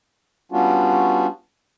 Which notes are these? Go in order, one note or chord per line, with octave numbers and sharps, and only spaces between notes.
G3 B3 C#4 D4 F4 F#4